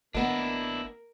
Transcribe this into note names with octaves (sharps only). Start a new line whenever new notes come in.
G#1 A#3 B3 D4 E4 A#4 D#5